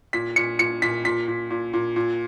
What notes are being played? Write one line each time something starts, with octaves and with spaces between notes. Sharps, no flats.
A#2 B6
A#2 C#7
A#2 C#7
A#2 B6
A#2 B6
A#2
A#2
A#2
A#2